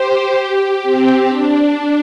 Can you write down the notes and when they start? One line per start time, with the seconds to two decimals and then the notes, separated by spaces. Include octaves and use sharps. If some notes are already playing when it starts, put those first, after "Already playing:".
Already playing: G4 C5
0.83 C4
1.29 D4